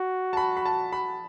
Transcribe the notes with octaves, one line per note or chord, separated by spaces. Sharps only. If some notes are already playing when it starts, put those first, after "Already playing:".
Already playing: F#4
A5
B5
B5
A5
B5